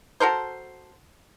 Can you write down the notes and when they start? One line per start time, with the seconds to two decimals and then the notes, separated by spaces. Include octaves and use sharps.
0.20 F#4 A4 A#4 C5